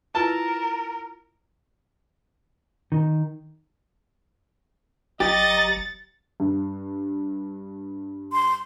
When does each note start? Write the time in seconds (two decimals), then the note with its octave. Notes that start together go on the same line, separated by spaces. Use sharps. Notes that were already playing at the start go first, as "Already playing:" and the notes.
0.15 E4 F4 A#4 B4 A5
2.92 D#3
5.20 G1 F#3 G4 D#5 A#5 A6
6.40 G2
8.33 C6